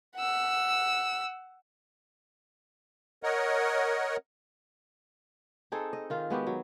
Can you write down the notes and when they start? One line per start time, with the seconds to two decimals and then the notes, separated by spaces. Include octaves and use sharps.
0.16 F#5 E6
3.23 A#4 C#5 D#5 F#5
5.72 C4 D#4 G#4 A4
5.93 D#5
6.10 D#3 F4
6.30 G#3 B3 F#4 G4
6.47 F#3